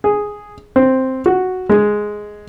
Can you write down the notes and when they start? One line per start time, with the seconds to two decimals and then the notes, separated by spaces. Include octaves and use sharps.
0.04 G#4
0.76 C4
1.26 F#4
1.69 G#3